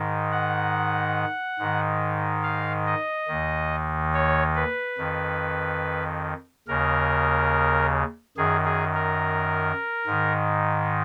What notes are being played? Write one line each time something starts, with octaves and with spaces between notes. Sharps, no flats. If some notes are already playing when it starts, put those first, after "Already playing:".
Already playing: G#2 D#3
F#5
G#2 D#3
F5
D#5
D#2 D#3
C#5
B4
F2 D#3
D#2 C#3 A#4
F#2 D#3 G#4
G#4
A#4
G#2 D#3